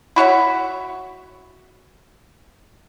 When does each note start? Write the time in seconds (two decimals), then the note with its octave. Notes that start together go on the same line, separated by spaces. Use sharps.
0.16 E4 F#4 C#5 E5